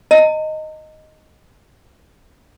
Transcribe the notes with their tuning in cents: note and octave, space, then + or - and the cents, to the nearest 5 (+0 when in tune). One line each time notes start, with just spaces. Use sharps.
D#5 +0 A#5 -40